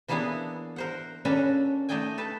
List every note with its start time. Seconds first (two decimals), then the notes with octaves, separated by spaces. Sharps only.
0.08 E3 A#3 B3 D4 E4 G#4
0.76 A#4 C5 F#5
1.25 A#3 C#4 D4 F#4 A4 B4
1.89 A3 D#4 D5 D#5 G5 G#5
2.18 A4 B4 A5